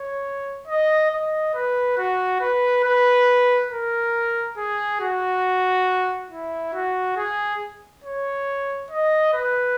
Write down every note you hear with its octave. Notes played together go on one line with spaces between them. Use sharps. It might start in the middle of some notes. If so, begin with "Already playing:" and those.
Already playing: C#5
D#5
D#5
B4
F#4
B4
B4
A#4
G#4
F#4
E4
F#4
G#4
C#5
D#5
B4